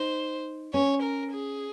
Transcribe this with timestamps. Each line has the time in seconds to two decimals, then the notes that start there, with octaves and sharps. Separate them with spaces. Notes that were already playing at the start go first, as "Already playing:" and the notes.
Already playing: D#4 C5
0.74 C#4 C#5
1.02 A#4
1.32 G#4